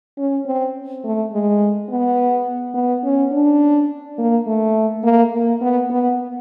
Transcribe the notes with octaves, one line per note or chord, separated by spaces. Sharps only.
C#4
C4
A3
G#3
B3
B3
C#4
D4
A#3
A3
A#3
A#3
B3
B3